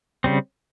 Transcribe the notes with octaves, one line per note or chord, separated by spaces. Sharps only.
C#3 G3 C4